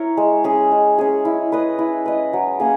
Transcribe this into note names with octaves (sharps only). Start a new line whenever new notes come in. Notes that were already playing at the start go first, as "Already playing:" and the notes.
Already playing: E4 A#4 C#5
G#3
C#4 G#4
G#3
C#4 G#4
E4
B4 D#5
E4
B4 D#5
F#3
A#3 C#4 G#4